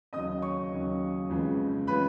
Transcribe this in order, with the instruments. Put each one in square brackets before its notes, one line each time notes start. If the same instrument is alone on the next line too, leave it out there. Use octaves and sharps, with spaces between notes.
[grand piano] D#2 C#3 F#3 D#5 D#6
C#5 C#6
D#2 C#3 F#3
F2 C#3 F3 G#3 B3
C#3 F3 G#3 B3 B4 B5